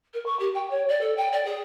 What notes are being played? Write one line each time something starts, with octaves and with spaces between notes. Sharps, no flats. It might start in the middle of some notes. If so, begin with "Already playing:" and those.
A#4
C#6
G4
G5
C#5
D5
A4
G5
D5
G#4